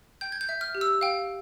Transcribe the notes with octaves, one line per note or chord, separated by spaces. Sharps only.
G5 G6
G#6
G6
E5
F6
G4
E6
F5 G5